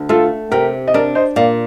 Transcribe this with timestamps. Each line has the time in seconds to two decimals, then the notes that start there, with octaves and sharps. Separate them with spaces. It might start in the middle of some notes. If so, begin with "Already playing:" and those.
Already playing: D2
0.09 A3 F4 A4
0.52 C3 G4 A#4
0.88 D#5
0.94 D4 A#4 D5
1.15 C5 D#5
1.36 A#2 D5 F5